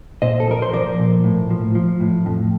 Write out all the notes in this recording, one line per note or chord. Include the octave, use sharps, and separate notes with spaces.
A#2 C5 D#5
A4
F3 A#4
C5
F3 A#4 D5
A#2
A2
F3
F3
A2
F2